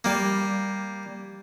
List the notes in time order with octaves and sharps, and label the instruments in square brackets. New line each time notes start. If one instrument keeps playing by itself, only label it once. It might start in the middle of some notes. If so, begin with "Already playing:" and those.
[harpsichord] G3 A#3